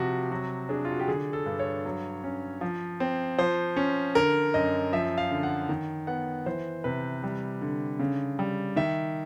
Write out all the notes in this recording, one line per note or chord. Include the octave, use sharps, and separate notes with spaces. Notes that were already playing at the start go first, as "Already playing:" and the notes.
Already playing: C3 F3 F#4 G4
F#3 F#4
D4 G#4
F4
F#4
G4
D3 G#4
A4
G2
C#5
F#3
C#4
F3
C4
F3 C5
C#4
D3 A#4
F#2 D#5
F3 E5
F5
D3
F#5
D#3
B3 F#5
E3 C5
C3 B4
G3
D3
C#3
G3
D#3 E5